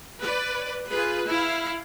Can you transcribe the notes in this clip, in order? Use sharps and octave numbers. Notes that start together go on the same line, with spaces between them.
B4 D5
F4 G#4 B4
E4 F5